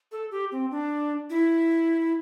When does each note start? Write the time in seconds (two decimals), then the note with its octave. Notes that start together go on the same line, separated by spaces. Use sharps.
0.12 A4
0.31 G4
0.52 C4
0.71 D4
1.30 E4